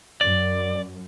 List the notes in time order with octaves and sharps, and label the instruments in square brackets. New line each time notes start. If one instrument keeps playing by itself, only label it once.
[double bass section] F#2 [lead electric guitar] D5